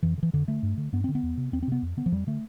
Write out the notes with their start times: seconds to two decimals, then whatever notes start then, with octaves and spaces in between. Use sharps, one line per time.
0.03 F2 E3
0.18 D3
0.23 E3
0.33 F2 D3
0.48 D3 A3
0.63 G2
0.77 D3
0.93 G2 B3
1.04 D3 C4
1.15 B3
1.23 E2
1.37 C3
1.52 E2 C4
1.63 C4
1.68 C3 B3
1.82 F2
1.97 D3 B3
2.06 F3
2.12 F2 G3
2.27 D3 A3